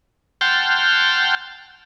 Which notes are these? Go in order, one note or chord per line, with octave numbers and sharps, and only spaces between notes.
F#5 G5 A5 C6 F6 G6